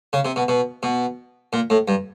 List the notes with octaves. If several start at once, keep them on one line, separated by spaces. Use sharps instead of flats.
C#3
C3
B2
B2
B2
A#2
A2
G2